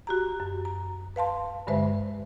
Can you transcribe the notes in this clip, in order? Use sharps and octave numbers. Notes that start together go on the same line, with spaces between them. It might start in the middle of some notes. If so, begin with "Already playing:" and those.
F#4 G4 A#5
F#2
A#5
B4 F5 A5 C6
G2 D3 G#3 B4 C5 E5